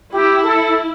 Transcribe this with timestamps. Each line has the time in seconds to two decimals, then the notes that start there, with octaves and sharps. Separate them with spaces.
0.13 E4 G4
0.43 A4